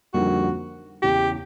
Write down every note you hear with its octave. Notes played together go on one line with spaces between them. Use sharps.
F2 D3 G3 A#3 D#4 F#4
E2 C#3 E3 G4